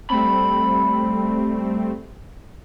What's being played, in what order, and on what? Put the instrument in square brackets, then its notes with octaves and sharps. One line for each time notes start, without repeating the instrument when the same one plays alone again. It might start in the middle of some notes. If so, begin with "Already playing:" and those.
[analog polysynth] G3 A3 C4 [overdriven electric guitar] B5